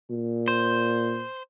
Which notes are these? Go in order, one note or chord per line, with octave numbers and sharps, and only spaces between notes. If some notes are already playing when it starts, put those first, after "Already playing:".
A#2
C5